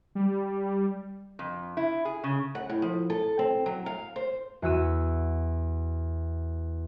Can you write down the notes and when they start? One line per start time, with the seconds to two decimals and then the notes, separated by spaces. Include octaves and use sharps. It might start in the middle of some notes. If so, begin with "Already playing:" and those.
0.15 G3
1.39 F2
1.77 E4
2.05 G#4
2.24 C#3
2.55 F#5
2.69 A2
2.82 F3
3.10 A4
3.39 C4
3.66 F#3
3.86 F5
4.16 C5
4.62 E2 F#4 E6 D#7